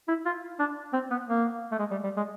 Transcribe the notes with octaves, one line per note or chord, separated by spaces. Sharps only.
E4
F4
D4
C4
B3
A#3
A3
G#3
G3
G3
G#3